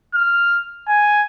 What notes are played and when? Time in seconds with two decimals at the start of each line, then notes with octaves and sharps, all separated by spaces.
0.15 F6
0.88 G#5